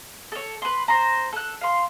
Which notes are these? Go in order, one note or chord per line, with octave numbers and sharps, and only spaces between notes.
A4 C#5
B4 C6
C5 A#5
A4 F#6
F5 C6